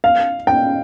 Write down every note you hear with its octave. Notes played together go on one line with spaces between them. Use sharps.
F5
G5